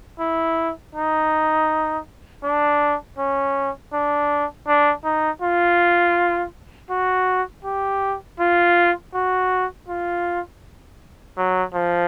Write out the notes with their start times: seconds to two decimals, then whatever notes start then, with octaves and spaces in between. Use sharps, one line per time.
0.20 E4
0.95 D#4
2.44 D4
3.18 C#4
3.93 D4
4.67 D4
5.04 D#4
5.42 F4
6.90 F#4
7.65 G4
8.40 F4
9.14 F#4
9.88 F4
11.38 F#3
11.74 F3